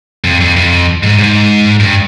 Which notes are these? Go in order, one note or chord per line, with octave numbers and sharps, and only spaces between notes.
F2
F2
F2
G#2
G#2
G2